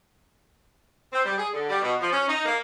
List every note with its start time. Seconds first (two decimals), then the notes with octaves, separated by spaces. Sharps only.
1.13 C4
1.25 G3
1.37 G#4
1.54 D3
1.70 G3
1.82 B2
2.01 F3
2.13 C#4
2.28 D#4
2.46 A#3